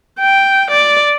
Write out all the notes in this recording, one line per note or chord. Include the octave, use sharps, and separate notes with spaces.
G5
D5